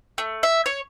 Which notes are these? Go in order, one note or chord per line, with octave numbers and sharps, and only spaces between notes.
A3
E5
C#5